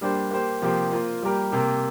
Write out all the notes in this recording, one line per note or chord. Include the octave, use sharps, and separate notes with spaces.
G3 A#3 D4 G4 C5
A#3 G4 C5
C3 F3 A#3 G4 C5
A#3 F4 C5
G3 A#3 G4 A#4
C3 A#3 G4